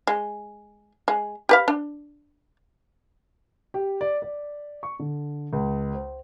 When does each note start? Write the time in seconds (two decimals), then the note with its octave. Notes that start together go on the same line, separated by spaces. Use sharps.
0.07 G#3
1.08 G#3
1.49 G4 B4 F5
1.68 D4
3.74 G4
4.01 D5
4.22 D5
4.83 C#6
4.99 D3
5.53 C#2
5.94 C5